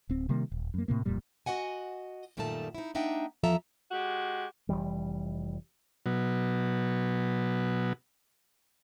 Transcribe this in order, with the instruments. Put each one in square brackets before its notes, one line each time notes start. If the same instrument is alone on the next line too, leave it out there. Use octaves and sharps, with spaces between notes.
[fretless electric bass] D1 C4
C3 D#3 G3 A#3
D#1
F#2 A#3
A2 C3 A#3
D1 F2 A#2 G3
[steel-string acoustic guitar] F#4 G4 D#5 F#5 G#5
F#2 A#2 D#3 G3 A3 A5
D#4 E4
A#3 D4 D#4 E5 F#5 G5
E2 F3 A4 E5 A#5
[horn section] G#3 F#4 G4
[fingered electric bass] F1 D#2 E3 G3
[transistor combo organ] B2 F#3